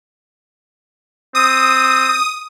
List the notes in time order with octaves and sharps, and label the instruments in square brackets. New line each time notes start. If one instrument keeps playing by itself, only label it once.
[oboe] C4 [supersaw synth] D#6